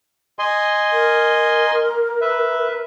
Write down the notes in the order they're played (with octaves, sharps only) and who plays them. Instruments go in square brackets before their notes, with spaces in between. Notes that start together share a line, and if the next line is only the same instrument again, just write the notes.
[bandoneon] D#5 G#5 C6
[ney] A#4
[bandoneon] B4 E5